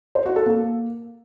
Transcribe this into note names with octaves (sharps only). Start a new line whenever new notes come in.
C5
F#4
A4
A#3